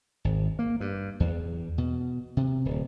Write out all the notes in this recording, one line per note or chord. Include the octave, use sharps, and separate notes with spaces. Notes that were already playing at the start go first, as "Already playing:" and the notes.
G#1
A#3
G2
E2
B2
C3
D1